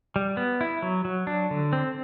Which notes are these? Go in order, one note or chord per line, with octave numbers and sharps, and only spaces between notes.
G3
B3
E4
F#3
F#3
D4
D3
C4